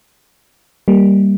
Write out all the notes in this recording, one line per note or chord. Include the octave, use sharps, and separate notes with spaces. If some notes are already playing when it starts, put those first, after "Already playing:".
G3 A#3